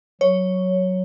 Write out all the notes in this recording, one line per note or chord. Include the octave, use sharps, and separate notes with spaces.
F#3 C#5